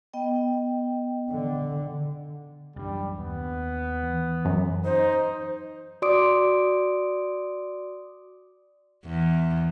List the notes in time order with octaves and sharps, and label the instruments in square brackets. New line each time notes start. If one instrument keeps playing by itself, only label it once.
[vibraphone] B3 D#5 G5
[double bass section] D3
[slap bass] A1 F#2 D4 [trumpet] G3
[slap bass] D#2 [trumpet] B3
[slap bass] E3
[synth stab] F#2
[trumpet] D#4 [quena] C5
[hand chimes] F#4 D5 C6 D6 D#6 D7
[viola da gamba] E2